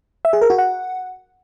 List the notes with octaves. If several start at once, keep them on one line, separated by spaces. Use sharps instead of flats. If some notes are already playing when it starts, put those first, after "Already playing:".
E5
G#4
A#4
F#4
F#5